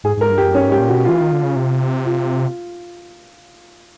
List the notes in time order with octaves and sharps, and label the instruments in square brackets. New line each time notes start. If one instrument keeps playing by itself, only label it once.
[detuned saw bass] G#2 [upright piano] G#4
[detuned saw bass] G#2 [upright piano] A#4
[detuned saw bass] G2
[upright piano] G4
[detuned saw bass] F#2
[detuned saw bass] G2 [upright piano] C#4
[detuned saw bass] G#2
[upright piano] G4
[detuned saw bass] A#2
[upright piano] F#4
[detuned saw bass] B2
[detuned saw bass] E3 [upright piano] F4
[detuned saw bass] D#3
D3
C#3
C3
[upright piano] F4